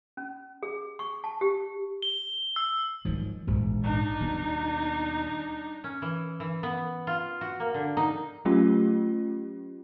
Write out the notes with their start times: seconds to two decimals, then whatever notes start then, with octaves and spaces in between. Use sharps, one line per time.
0.17 C#4
0.63 G#4
0.99 C#6
1.24 A5
1.41 G4
2.02 G7
2.56 E6
3.05 G#2 D#3 F3 F#3 G#3
3.47 E1 A#1 G#2
3.83 D4 D#4
4.20 D#2 B2 G3 B3
5.84 C#4
6.02 E3
6.40 E3
6.63 B3
7.07 F4
7.41 F#4
7.60 A#3
7.74 D3
7.97 D#4
8.45 F#3 A3 C#4 F4 G4